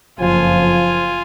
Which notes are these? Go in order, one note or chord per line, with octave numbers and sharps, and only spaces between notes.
F#1 F2 F3 F4 G#5